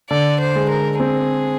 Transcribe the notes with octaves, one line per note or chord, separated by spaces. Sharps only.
D3 D5
C5
G#3
A#4
C4 G#4